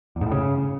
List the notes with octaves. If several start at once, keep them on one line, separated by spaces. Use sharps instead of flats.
E2
G#2
A2
C#3